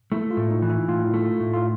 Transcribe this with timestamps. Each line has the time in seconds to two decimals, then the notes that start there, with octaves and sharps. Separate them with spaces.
0.12 A3 E4
0.31 F4
0.37 A2
0.51 D#4
0.62 E3
0.69 E4
0.88 A2 F4
1.14 A3
1.40 A2
1.53 F4